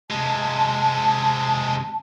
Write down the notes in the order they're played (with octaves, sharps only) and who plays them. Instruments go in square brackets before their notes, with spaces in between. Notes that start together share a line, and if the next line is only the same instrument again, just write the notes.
[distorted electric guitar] C3 G#3 [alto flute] A5